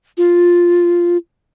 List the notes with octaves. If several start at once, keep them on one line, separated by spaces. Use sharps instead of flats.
F4